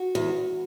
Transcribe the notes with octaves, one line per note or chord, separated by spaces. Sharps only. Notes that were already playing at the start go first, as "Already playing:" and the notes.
Already playing: F#4
E2